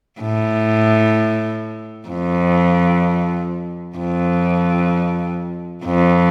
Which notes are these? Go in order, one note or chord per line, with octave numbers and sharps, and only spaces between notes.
A2
F2
F2
F2